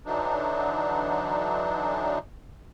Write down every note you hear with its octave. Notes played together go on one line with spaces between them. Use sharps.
D3 E3 F#3 D4 D#4